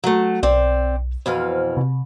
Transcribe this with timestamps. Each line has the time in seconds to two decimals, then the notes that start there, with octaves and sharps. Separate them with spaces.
0.04 F#3 A3
0.43 B1 C4 D5
1.26 F2 B2 E3 C5 F6
1.77 C3